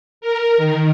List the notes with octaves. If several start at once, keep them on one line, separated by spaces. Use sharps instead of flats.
A#4
D#3